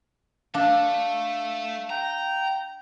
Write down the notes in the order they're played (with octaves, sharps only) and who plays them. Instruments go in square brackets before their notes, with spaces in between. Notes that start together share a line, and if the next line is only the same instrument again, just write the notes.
[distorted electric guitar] A3 A4 [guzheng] D4 [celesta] F5
[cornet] G5 [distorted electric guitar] A#5